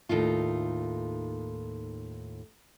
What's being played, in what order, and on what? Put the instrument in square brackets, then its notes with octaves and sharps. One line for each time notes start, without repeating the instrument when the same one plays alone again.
[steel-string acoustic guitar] D#2 A2 D#4 F4